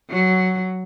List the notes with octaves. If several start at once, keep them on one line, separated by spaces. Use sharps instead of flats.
F#3